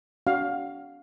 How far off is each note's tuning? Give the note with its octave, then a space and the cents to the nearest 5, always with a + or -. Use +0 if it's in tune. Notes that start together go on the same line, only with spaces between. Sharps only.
D4 -45 F#4 +25 F5 +15